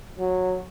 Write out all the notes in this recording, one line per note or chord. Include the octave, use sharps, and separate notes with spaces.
F#3